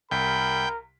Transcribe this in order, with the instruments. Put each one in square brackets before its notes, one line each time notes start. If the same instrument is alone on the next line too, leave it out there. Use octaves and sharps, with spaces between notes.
[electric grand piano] C2 B6 [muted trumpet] A#4 [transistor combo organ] G5 [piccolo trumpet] B5